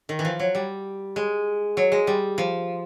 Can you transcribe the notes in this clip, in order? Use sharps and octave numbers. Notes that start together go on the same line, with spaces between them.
D#3
E3
F3
F#3
G3
G#3
F#3
G#3
G3
F3